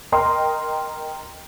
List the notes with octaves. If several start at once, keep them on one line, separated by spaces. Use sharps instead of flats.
A#4 D#5 G5 C6 D#6